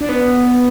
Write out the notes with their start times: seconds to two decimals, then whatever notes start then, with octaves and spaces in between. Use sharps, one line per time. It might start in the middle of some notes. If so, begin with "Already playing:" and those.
0.01 D4
0.09 B3